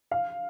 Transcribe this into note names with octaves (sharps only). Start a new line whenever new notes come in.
F5